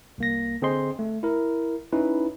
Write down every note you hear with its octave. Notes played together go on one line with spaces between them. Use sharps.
C2 A#3 A#6
D3 C4 G#4 C5 D#5 C6
A3
E4 A#4
C#4 D#4 E4 B4